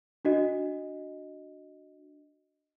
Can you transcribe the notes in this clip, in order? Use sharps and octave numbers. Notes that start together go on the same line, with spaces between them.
D4 F#4 D#5